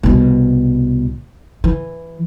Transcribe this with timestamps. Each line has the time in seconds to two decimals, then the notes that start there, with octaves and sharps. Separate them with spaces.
0.03 C2 B2
1.64 E3